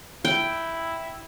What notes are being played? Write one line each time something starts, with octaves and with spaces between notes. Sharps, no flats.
E4 G5